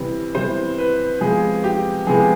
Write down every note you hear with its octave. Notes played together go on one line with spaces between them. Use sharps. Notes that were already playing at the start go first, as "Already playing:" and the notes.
Already playing: C3 E3 G3 B3
C3 E3 G3 B3 C5
B4
C3 F3 G#3 B3 G#4
G4
C3 F3 G#3 B3 G#4